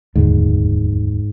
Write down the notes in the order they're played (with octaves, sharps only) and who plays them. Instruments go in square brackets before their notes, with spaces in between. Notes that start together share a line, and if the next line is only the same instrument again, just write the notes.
[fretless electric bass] F1 D#2 D3 [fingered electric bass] G#2